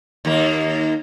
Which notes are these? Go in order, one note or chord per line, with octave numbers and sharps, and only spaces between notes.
D#2 A#3